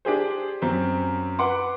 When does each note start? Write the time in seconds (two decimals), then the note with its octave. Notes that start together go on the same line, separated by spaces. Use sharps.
0.05 D4 G4 G#4 C5
0.62 F#2 C4
1.39 B4 F#5 C6 D6